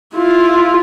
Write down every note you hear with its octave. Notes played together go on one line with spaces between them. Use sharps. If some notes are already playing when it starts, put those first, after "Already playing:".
E4 F4